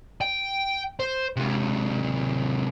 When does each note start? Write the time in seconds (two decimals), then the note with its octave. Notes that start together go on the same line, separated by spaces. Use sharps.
0.21 G5
1.00 C5
1.36 C3 G#3